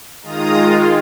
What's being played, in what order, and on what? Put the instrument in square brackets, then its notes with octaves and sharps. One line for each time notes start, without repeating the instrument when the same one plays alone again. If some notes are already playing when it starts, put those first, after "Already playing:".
[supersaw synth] D#3 G#3 F4 A#5 D#6